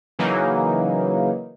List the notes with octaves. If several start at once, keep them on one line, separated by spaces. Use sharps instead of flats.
C#3 E3 F#3 A#3 D#4